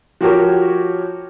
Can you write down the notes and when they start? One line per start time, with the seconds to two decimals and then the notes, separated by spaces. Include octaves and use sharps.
0.21 F3 F#4 G4 A#4 C#5